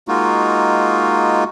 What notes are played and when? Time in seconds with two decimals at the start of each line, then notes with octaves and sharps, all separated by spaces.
0.08 G#3 A#3 D#4 F4 F#4